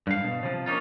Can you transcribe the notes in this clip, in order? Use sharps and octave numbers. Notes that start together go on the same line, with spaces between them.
G2 F5
B2
C3 F3
A#3 C#4 D#4 F4